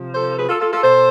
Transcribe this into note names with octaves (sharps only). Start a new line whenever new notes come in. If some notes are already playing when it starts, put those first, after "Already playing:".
Already playing: C3 F3
A4 C5
G#4 B4
F4 A4
F4 A4
F4 A4
B2 A4 C5